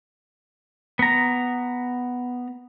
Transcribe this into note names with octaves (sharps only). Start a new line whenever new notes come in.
B3 A#5